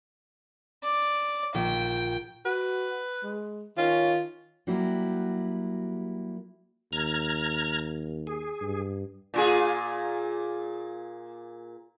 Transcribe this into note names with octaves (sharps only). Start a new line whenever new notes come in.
D5
A#1 G5
F#4 B4
G#3
D#3 C#4 F4
F#3 G3 A#3 E4 F#4 G4
D#2 A#5 F6 G#6
G#4
G2
A#2 F4 G#4